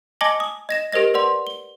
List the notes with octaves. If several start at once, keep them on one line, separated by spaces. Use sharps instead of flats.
D#5 G#5 A5 D6 A#6 F#7
D#6
D#5 A#6 E7
G4 A#4 C5 D#5 A#6
B4 D5 F#5 C6
G7